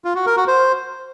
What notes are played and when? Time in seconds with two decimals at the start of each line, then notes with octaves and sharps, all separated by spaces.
0.04 F4
0.15 F#4
0.26 A#4
0.37 F#4
0.48 C5